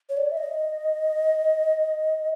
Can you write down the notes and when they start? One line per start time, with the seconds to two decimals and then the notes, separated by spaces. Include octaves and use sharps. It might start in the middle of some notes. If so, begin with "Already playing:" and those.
0.09 C#5
0.17 D5
0.31 E5
0.37 D#5